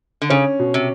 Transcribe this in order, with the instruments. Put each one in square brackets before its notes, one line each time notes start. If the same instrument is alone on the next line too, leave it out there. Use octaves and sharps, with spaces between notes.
[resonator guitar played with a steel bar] D3
[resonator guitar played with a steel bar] C#3 [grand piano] C#4
[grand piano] B2
[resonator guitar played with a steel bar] C3